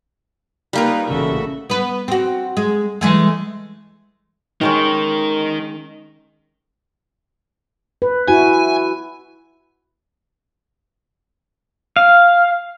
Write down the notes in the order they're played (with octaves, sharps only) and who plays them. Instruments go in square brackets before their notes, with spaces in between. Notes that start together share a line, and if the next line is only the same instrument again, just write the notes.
[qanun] G3 A#3 A#4 [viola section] D#4 F4 B4
[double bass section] A1 C#3 [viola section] F#4 A4 E5
[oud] B3 B4
C4 F#4
G#3
E3 G#3 A3
[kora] D#3 G#3 C#4 [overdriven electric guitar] D#4 A#4
[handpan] B4
[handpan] E4 F#4 [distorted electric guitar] G#5
[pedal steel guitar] F5